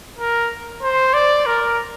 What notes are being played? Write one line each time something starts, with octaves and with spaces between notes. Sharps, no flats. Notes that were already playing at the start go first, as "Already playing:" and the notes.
A#4
C5
D5
A#4